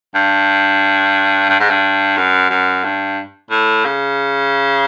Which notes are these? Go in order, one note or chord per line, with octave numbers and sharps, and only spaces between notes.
G2
G2
G#2
G2
F#2
F#2
G2
A2
C#3